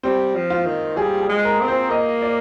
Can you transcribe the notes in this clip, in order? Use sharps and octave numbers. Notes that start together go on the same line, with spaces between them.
G3 C4
F3
F4
D#3
G3 G#4
G#4
G#3
A#4
C4
C5
A#3 D#5
D5